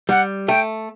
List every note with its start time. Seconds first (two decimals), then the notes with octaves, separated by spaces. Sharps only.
0.09 G3 F#5
0.48 A3 G5